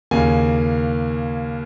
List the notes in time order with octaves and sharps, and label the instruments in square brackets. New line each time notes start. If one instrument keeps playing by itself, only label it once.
[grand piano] D#2 C#3 A#3 G#5